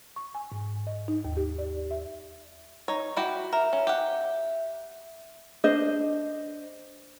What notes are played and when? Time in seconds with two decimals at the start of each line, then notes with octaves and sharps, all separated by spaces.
0.16 C#6
0.35 G#5
0.52 G#2
0.87 D#5
1.08 D#4
1.25 D#2
1.37 G4
1.58 D5
1.91 E5
2.88 D#4 C#5
3.17 E4 F#4 G4
3.53 A#4 E5
3.73 C#4
3.87 G4 F#5
5.64 D4 C5 D#5